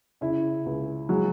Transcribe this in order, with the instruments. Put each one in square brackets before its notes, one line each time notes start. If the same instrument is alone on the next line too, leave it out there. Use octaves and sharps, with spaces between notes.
[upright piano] C#3 [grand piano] E4
[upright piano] C#2
[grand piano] F#3 [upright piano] G#3